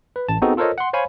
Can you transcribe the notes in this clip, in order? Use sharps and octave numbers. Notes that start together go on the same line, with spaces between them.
B4
A1 A5
B3 C4 D#4 F#4 G#4 A4
F4 A4 A#4 C5 C#5 D#5
F#5 C6
C5 C#5 F5 G#5 B5